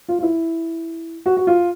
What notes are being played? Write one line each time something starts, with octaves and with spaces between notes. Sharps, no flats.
F4
F4
E4
F#4
F#4
F4